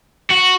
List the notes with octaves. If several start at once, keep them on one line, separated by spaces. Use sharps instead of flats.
F#4